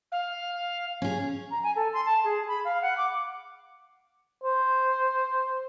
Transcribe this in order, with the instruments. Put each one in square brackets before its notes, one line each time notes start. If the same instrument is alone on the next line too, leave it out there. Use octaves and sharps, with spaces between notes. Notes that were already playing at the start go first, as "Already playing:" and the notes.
[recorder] F5
[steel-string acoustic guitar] C#4 G#4
[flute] A#5
G#5
A4
C6
A5
G#4
B5
F5
F#5
D6
[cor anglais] C5